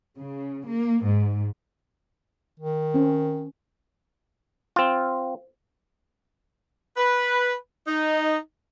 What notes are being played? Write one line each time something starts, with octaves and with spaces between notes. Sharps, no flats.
C#3
A#3
G#2
D#3
C4 C#4
C4 F4
B4
D#4